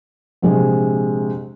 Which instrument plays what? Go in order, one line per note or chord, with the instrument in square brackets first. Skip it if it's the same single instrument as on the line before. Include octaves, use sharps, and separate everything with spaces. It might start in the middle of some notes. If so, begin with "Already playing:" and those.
[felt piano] A#1 C3 G#3